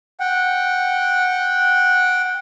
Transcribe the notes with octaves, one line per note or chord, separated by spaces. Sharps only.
F#5 G5